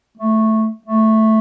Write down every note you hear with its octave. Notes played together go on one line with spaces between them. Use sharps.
A3
A3